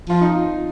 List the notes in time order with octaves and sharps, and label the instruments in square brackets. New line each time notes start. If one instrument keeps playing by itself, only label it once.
[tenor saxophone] F3 [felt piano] F4
[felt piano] D#4